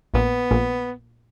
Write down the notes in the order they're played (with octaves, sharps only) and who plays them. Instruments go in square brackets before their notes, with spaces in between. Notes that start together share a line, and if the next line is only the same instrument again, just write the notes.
[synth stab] A#1 A#2 [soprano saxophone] B3
[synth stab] A#1 A#2